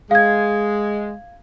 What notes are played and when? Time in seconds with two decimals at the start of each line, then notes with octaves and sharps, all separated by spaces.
0.11 G#3 F5 G#6